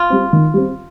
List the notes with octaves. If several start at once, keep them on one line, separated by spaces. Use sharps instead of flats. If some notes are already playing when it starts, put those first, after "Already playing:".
Already playing: F4
G3 C4
D#3
G3 C4